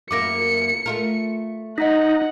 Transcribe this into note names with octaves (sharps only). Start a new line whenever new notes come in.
F#2 A#3 E4 D6 A#6 C#7
A3 F4 A#4
D#4 D#5 F#5 A#5 B6